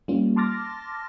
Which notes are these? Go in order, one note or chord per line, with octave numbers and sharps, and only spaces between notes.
G3 A#3 C#4 F4
A5 C6 D6 F6 A6 A#6